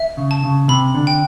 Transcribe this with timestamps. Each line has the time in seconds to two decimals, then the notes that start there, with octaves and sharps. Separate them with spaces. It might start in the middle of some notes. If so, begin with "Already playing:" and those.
Already playing: E5
0.17 C#3
0.31 A5
0.44 C#3
0.68 C3 B5
0.95 D3
1.07 G5